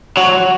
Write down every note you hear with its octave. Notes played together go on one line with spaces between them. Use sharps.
F#3 C#5